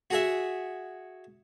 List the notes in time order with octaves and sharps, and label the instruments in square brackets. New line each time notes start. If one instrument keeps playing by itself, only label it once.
[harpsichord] F#4 G#4 E5